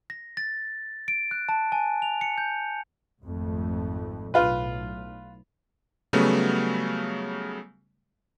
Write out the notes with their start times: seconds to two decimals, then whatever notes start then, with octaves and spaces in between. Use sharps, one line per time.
0.10 A#6
0.37 A6
1.08 D7
1.31 F#6
1.49 A5
1.72 G#5
2.02 F7
2.21 C#7
2.38 G6
3.22 G#1 F2 A3
4.34 B1 A2 F4 B4
6.13 C#3 F#3 G3 A3 B3